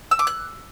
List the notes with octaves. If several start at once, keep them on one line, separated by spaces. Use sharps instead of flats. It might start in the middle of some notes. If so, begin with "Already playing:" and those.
E6
D6
F#6